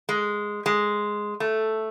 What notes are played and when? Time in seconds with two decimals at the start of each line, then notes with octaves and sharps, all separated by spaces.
0.09 G#3
0.66 G#3
1.40 A3